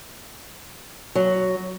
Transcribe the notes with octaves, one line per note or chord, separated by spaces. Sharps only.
F#3